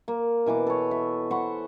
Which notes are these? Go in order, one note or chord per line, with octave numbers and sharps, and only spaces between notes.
A#3
B2 E3 B4 D6
A4 C#5
E5
C5 F#5 B5 C#6